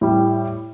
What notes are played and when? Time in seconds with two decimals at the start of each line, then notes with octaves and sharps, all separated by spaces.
0.01 A2 G3